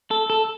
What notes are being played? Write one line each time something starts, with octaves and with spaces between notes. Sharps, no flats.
A4
A4